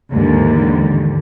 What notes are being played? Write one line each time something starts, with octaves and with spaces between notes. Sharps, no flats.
D#2 G#2 D3 E3